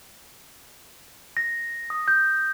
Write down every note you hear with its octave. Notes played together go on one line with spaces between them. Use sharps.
A#6
D#6
G6